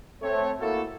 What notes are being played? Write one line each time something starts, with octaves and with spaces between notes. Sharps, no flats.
A3 C4 A4 C#5
A3 A#3 E4 F#4 A4